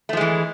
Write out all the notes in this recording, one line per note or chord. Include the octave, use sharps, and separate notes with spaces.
E3 F3 G#3 A3